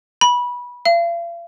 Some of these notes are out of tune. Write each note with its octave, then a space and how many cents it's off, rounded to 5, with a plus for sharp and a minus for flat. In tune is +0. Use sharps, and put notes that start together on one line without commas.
B5 -20
F5 -45